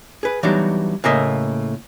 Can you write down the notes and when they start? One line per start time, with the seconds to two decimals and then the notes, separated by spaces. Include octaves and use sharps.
0.23 G#4 B4
0.43 E3 F#3 G3 B3 D4 D#4
1.04 A2 C#3 A#3 D#5 E5